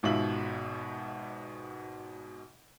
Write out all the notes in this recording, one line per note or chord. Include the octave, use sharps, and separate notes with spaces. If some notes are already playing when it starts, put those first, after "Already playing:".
G#1 G#2 B2 F4 E5 F#7